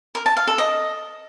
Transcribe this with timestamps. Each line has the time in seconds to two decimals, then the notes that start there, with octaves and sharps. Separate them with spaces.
0.15 A#4
0.26 A5
0.37 F5
0.47 A4
0.58 D#5